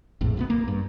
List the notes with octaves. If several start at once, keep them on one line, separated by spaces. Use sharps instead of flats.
A#1 F2 A2
D2 D3 B3
A#3
G2